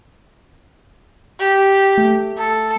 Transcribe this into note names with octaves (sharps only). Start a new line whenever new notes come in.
G4
A3
A4